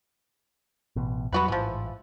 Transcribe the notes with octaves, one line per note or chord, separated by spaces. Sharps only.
A1 B2
E2 F#3 G3 B3 F#4 B4
A1 G#2 E3 F3